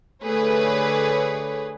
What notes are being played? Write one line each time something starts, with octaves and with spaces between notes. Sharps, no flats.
D3 A3 G#4 B4 C#5